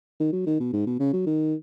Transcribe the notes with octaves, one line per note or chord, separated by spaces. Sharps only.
D#3
F#3
D#3
B2
G#2
B2
C#3
F#3
D#3